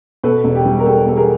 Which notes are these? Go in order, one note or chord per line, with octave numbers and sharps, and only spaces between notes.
B2 A4 B4
E1
G4
G3
A#4
E2 G4 A4
B2 A4
G#4 A#4